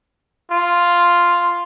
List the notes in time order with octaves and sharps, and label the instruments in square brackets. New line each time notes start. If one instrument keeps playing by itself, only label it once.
[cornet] F4